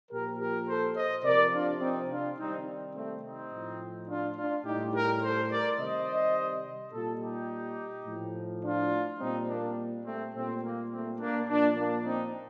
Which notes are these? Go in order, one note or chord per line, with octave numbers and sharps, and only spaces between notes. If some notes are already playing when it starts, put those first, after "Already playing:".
A#2 F3 G4 A#4
G4 A#4
A4 C5
C5 D#5
C3 F3 A#4 D5
D4 F4
C4 D#4
D4 F4
C3 D#3 G3 C4 D#4
A3 C4
C4 D#4
A2 F3
D4 F4
D4 F4
A2 G3 D#4 G4
G4 A#4
A4 C5
A#4 D5
C3 D#3 G3 C5 D#5
A#2 G3 F4 A4
D#4 G4
A2 F3
D4 F4
A#2 G3 C4 D#4
A#3 D4
A3 C4
A#2 G3 A3 C4
A#3
A3 C4
A#3 D4
A#2 F3 A#3 D4
A#3 D4
C4 D#4